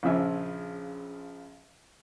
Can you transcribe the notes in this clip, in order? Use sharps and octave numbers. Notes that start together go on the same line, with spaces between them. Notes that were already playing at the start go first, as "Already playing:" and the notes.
A#1 C#3 F3 E5 G#5